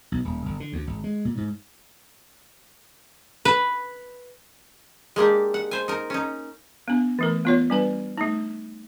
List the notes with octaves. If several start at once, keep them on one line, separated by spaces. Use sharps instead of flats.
B1
D#1
G1
D3
D2
G#1
G#3
A#2
G#2
B4
G#3 A#3 D4 G4
F#5
C5 G#5
D#4 A#4
C#4 D#4
B3 D4
E3 A3 A#4
B3 F4 C#5
G3 D4 B4
A3 D#4